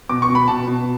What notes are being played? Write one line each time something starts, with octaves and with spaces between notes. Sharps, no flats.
B2 D6
C#6
B2
B5
B2 A5
B2